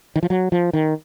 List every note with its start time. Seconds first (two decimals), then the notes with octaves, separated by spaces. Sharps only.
0.16 D#3
0.23 F3
0.30 F#3
0.52 F3
0.73 D#3